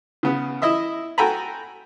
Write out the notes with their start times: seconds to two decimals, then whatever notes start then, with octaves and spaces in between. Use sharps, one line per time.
0.23 C#3 B3
0.62 E4 D#5 E5 D#6
1.18 F#4 A4 G5 G#5 A#5 B5